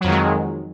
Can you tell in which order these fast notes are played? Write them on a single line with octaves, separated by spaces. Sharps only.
F#3 F2 D#3 G#3